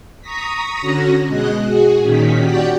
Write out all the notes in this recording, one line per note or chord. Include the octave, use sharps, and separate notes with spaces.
A#5 C#6 D#6 A#6 B6
D3 C#4 F#4 A#6
B2 G#3 D#5 F#6
F#4 G#4
A#2 D#3 C#4 B6
F#4 G4 D5 F#5 G5